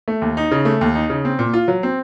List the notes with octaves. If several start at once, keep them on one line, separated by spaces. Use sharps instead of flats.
A3
D#2
D#4
C#3
A3
D#2
D#4
C#3
C4
A#2
F4
F#3
C4